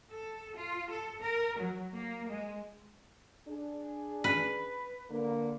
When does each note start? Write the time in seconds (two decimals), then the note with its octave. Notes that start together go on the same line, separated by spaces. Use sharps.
0.11 A4
0.56 F4
0.90 A4
1.21 A#4
1.58 F#3
1.93 A#3
2.28 G#3
3.47 D4 G#4
4.24 B4
5.09 D3 A#3